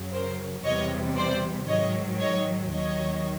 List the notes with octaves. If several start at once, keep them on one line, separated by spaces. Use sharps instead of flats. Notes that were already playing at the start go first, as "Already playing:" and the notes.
Already playing: F#2 C#3 F#3
A#4 C5
E2 C3 E3 G3 C#5 D#5
C5 D5
G#2 D#3 F#3 C#5 D#5
C#5 D#5
D#2 D#3 F#3 C#5 D#5